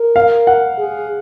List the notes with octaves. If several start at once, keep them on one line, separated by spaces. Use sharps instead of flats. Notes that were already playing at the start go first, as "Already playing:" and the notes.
Already playing: A#4
F5
F#5
G#4